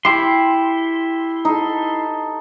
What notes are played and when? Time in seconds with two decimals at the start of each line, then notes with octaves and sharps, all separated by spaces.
0.05 E4 G4 C6
1.45 D#4 A4